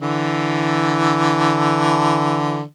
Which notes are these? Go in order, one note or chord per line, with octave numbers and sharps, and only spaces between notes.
D3 E3